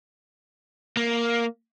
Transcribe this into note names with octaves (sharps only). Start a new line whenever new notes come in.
A#3